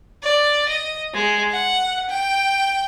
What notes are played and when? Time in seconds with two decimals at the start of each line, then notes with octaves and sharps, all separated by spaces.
0.23 D5
0.69 D#5
1.14 G#3
1.52 F#5
2.10 G5